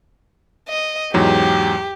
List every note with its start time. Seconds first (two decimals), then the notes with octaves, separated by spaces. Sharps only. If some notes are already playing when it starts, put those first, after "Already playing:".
0.69 D#5
1.14 E2 G#2 F#3 G4